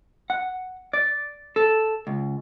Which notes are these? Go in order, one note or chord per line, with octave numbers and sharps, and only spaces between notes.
F#5
D5
A4
C#2